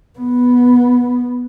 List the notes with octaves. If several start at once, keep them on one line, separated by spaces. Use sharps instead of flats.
B3